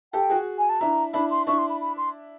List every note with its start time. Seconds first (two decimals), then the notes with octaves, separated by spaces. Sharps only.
0.13 G4 A4 G5
0.30 F#4 G#4
0.58 G#5
0.69 A5
0.80 D4 E4 A#5
1.13 D4 E4 B5
1.31 C6
1.47 D4 E4 C#6
1.58 C6
1.70 B5
1.81 B5
1.97 C6